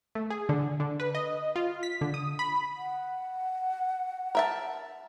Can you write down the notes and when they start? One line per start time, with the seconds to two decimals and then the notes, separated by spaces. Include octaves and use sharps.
0.15 A3
0.30 G#4
0.49 D3
0.80 D3
1.00 B4
1.15 D#5
1.56 F4
1.83 B6
2.01 D3
2.14 D#6
2.39 B5
2.77 F#5
4.35 A#4 E5 A5